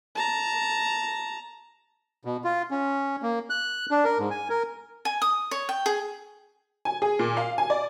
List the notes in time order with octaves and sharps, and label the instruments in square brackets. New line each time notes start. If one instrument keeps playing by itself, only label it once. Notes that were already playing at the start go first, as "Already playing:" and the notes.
[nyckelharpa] A5 A#5
[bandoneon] B2
F4
C#4
A#3
F#6
D4
A#4
G#2
G#5
A#4
[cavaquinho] G#5
D#6
C#5
G5
G#4
[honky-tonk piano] G#5
G#4
A#2
F5
G#5
D5